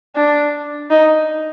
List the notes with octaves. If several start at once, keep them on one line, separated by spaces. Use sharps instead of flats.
D4
D#4